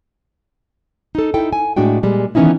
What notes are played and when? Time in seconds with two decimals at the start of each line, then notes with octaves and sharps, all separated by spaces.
1.15 D#4 A4
1.34 D#4 E4 A4 G5
1.53 G#5
1.77 A2 G#3 D4 F#4 G5
2.03 A#2 G3 G#3
2.35 D#3 E3 B3 C#4 D#4 E4